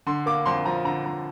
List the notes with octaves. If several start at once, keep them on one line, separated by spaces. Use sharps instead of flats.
D3 C6
A#3 D6
F2 C6
F3 A#5
D3 A#5
F2 A#5